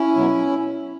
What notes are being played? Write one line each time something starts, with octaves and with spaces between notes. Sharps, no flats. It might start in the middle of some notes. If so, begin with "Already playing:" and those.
Already playing: C#4 E4
B2 F#3